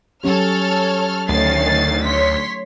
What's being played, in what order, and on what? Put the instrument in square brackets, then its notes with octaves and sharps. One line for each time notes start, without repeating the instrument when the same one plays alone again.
[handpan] F#3 C#4 G4 [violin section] A4 C#5 [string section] F6
[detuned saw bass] D2 [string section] D#3 C#4 C7 [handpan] A3 [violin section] A6
[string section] C#5 C6 [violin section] B6